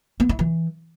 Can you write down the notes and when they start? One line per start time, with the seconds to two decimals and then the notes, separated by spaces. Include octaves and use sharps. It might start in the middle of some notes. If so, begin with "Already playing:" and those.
0.20 B3
0.29 E4
0.39 E3